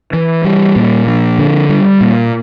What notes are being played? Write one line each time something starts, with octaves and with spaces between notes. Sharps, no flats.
E3
G3
A#2
F3
D3
G3
A#2